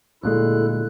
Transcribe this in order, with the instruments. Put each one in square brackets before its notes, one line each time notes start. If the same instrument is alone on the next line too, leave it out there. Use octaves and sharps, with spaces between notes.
[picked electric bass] D2 A#2 G#3 [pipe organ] E4 A4 F#6